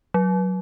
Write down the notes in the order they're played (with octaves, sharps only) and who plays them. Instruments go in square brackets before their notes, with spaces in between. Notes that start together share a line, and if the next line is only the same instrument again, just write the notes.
[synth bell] F#3